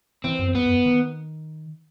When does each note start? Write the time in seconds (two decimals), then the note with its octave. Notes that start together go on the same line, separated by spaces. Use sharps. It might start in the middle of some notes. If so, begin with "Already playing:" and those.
0.24 E3 C4
0.39 F#2
0.55 E2 B3
0.66 F#2
0.86 D#3